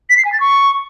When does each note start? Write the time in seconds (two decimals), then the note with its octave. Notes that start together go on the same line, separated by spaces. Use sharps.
0.10 B6
0.17 C7
0.25 G#5
0.32 A6
0.40 C#6